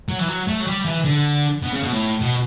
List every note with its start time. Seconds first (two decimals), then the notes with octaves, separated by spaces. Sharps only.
0.09 F#3
0.19 E3
0.28 F#3
0.48 A3
0.60 F#3
0.67 G3
0.85 E3
1.05 D3
1.62 B2
1.73 C#3
1.83 B2
1.92 A2
2.21 B2